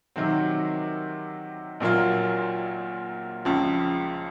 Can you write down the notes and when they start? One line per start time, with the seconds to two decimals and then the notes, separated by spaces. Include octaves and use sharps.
0.16 C3 D#3 F#3 C4
1.80 A#1 A#2 F#3 A#3 F4
3.45 C#2 C#3 F3